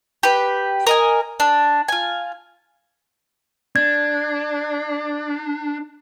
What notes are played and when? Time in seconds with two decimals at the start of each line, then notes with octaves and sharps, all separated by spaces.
0.23 G4 B4
0.87 A#4 D#5 G#5
1.40 D4
1.88 F4 G#5
3.76 D4 G#6